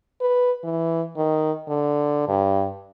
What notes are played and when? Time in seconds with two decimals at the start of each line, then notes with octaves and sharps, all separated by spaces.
0.21 B4
0.64 E3
1.17 D#3
1.68 D3
2.28 G2